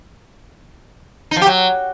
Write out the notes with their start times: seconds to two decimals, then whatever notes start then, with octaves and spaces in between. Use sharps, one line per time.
1.31 D#4
1.36 F3
1.41 G4
1.47 F#3